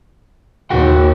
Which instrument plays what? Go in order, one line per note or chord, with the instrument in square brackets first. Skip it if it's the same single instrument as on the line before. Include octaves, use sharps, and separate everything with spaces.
[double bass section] D#2 [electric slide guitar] F#4 F#5 G5